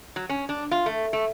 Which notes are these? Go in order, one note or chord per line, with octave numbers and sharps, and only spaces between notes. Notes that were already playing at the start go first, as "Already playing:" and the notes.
F#3
C#4
D4
F4
A3
A3